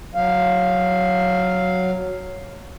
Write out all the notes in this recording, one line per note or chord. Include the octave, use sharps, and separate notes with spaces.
F#3 F5